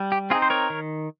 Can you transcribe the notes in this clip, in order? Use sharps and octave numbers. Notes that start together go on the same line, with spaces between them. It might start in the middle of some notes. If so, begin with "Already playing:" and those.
Already playing: G3
G4
C4 D#4 F4 G#4
C5
A#4 C#5
D#3